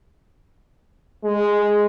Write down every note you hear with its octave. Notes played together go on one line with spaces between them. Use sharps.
G#3